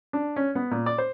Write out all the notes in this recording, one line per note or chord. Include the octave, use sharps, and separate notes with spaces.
D4
C#4
B3
A#2
D5
C5